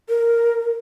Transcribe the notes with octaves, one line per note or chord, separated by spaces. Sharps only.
A#4